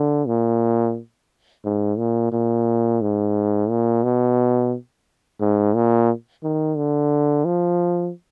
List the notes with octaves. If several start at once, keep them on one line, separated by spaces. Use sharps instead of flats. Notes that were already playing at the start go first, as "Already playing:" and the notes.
Already playing: D3
A#2
G#2
A#2
A#2
G#2
A#2
B2
G#2
A#2
D#3
D3
F3